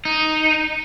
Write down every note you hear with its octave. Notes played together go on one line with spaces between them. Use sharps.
D#4